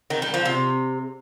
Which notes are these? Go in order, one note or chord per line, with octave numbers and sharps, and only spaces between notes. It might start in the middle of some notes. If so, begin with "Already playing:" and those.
D#3
G3
F3
C3